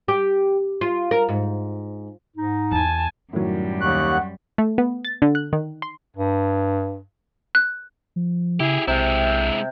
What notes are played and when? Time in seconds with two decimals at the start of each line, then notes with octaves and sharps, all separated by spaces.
0.08 G4
0.81 F4
1.11 A#4
1.29 G#2
2.37 G#2 D#4
2.72 E2 G#5 A5
3.33 F#2 A2 D#3 F#3 G3
3.81 D#2 F#5 C#6 F#6
4.58 A3
4.78 B3
5.05 A6
5.22 D3
5.35 F#6
5.53 D#3
5.82 C6
6.16 G2
7.55 F#6
8.16 F3
8.60 C#3 E4 G4 G#4
8.88 B1 C3 G#3 E4 E5